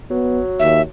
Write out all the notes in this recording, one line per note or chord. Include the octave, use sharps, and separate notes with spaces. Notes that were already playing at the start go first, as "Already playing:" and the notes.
F#3 B3
D#2 E5